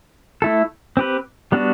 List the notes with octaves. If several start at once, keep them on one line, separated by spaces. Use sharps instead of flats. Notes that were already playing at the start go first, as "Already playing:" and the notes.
A3 E4 A4
C4 G4 B4
G3 B3 D4 F#4